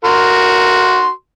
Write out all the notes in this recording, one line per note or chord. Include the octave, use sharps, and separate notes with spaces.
F#4 A#4 C6